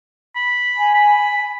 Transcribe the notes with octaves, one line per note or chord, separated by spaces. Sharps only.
B5
G#5
B5